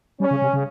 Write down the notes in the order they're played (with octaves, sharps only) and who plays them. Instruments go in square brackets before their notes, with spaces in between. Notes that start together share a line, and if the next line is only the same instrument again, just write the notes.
[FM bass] G3 [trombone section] C#4
[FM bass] C#3
C3
C#3